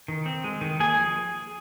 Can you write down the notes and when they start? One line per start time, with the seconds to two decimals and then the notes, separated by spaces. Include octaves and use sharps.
0.08 D#3
0.26 C4
0.44 G#3
0.61 D#3
0.80 A#3 G#4 G#5
0.98 F3